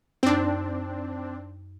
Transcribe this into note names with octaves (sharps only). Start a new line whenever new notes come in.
F#2 C4 D4 D#4